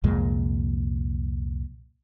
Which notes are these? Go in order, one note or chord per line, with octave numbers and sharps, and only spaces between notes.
C2 F2 A#2 G#3